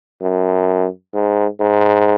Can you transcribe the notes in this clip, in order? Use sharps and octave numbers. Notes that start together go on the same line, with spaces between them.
F#2
G#2
G#2